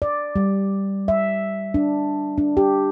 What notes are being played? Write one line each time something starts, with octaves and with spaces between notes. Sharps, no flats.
D5
G3
E5
D4
D4
G4